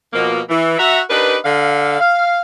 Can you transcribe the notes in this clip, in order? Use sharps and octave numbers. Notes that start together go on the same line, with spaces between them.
B2 F3 A#3
E3
F#4 E5 A#5
D4 D#4 G4 A#4 B4
D3 F5
F5